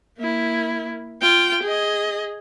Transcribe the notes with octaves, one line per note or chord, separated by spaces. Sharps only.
A#3 E4
F4 G5
G#4 D#5